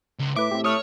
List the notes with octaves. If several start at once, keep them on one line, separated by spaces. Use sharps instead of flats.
C#2
A2 B4 E5 D6
A2 C4 G4
A3 C#5 D#6 F6